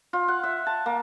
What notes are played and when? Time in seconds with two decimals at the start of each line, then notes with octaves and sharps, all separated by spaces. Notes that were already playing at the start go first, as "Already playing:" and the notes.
0.13 F4
0.28 F#5
0.43 E5
0.67 A5
0.86 A#3